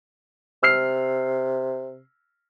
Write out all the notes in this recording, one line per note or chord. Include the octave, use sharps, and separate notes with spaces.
C3 E6 F6 C7